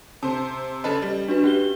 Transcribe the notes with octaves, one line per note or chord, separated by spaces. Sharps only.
C3 C5 A5
C#3 A4 B4 D#5
G3
D4 F#4 B4
C#4 G4 G7